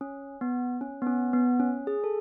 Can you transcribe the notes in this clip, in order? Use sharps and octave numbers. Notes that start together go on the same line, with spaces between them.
C#4
B3
C#4
B3
C#4
B3
C#4
G#4
A4